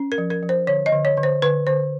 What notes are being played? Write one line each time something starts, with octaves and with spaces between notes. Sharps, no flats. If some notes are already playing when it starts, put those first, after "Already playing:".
Already playing: C#4
A#4
F3
A#4
F3
C5
D3 C#5
D#5
D3
C#5
D3
C5
D3 B4
D3 C5